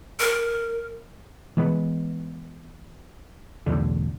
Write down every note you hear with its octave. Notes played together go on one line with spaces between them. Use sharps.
A#4
E3 G#3 B3
B1 E2 A2 D3